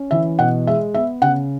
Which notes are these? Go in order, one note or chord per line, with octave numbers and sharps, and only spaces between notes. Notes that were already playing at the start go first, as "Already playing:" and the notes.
Already playing: C#4
E3 E5
B2 F#5
G#3 E5
B3 E5
C#3 F#5